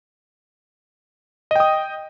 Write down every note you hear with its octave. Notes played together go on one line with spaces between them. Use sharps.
D#5 G5 D#6